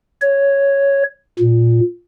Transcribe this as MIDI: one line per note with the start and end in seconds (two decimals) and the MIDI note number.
0.22 1.03 73
1.39 1.80 46